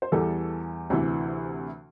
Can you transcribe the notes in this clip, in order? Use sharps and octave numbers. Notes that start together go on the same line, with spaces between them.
C5
E2 E3 G3 A4
D2 C3 E3